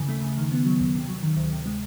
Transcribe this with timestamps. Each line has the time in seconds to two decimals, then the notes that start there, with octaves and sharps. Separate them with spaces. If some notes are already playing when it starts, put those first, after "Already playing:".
Already playing: D#2 C#3 E3
0.09 A3
0.22 C#3
0.37 D#3
0.52 B3
0.65 F#3
0.80 D#2
0.95 C3
1.09 F#3
1.23 D#3
1.37 D2
1.52 C3
1.66 G#3